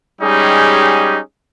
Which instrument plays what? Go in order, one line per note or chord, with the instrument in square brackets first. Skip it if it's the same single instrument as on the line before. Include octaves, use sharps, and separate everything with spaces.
[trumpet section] G3 G#3 C#4 D#4 G4 G#4